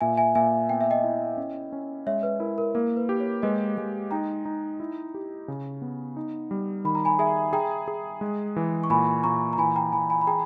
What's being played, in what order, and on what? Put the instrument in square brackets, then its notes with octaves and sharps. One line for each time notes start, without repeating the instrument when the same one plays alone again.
[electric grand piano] A#2 [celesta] E5 G#5
[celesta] E5 G#5
[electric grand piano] A#2 [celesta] E5 G#5
[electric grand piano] B3 [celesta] G5
[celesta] E5
D#5 G5
[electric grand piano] E4
C#4
C#4
[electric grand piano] G#3 [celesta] C#5 E5
[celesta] B4
[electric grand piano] E4 [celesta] A#4
[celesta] A#4
[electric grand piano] A#3 [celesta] A#4
[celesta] B4
[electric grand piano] G4
[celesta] C#5
[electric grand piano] G#3 [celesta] B4 D#5
[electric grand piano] G#3
[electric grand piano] D#4 [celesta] G5 A#5
[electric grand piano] D#4
E4
G4
C#3
B3
D#4
G3
[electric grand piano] D#3 [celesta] B5
[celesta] A#5
G#5 B5
[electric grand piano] G#4 [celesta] E5 G#5
[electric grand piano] G#4 [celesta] G5 A#5
[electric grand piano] G#4
G#3
E3
[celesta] C#6
[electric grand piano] A#2 [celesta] G#5 B5
[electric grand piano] A#2 [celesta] A#5 C#6
[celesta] A#5
[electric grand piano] E3 [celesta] G#5 B5
[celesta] G5 A#5
[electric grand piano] E3 [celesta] G#5 B5
[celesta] G#5 B5
B5
[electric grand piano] G#4 [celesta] G5 A#5